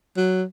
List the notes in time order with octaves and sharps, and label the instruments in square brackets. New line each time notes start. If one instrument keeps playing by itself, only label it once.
[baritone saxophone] F#3